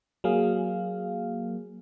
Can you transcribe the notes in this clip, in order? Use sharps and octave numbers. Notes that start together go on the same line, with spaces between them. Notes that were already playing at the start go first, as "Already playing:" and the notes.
F#3 A#3 G#4 F5